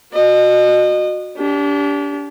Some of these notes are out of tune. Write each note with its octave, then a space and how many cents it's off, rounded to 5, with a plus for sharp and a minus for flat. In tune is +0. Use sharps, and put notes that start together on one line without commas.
F#4 -20 D#5 -30
D4 -35 G4 +5